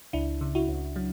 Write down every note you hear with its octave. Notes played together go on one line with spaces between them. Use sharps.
C#2 D4 E4
C#3
E4 F#4
C#2
F#3